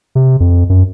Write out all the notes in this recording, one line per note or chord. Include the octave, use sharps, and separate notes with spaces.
C3
F2
F#2